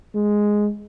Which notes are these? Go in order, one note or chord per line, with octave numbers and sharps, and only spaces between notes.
G#3